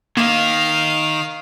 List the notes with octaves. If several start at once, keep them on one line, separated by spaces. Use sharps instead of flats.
D#3 A#3 F5